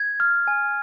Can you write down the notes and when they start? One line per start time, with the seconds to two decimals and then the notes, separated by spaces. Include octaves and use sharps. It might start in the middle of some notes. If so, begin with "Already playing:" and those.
Already playing: G#6
0.20 F6
0.48 G#5